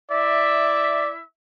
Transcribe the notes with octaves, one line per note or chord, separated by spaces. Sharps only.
E4 D5 E5